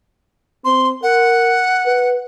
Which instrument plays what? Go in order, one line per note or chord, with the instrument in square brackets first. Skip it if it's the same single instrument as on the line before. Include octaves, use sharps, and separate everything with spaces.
[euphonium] C4 [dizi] C6
[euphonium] A#4 [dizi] F#5
[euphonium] B4